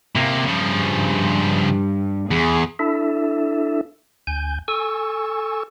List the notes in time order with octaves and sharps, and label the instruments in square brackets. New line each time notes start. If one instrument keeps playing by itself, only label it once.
[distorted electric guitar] C3 A#3
[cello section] G2 [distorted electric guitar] C#3 F3
[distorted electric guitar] E2 [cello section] G#4
[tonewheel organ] D4 E4 A4 E5
D2 G#5 G6
A4 G#5 C#6 E6